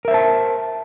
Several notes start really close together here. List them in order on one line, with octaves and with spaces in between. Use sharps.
A#4 E5 C5 A5